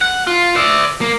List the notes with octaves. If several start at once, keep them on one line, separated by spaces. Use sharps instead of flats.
F#5
F4
D5 E5
A#3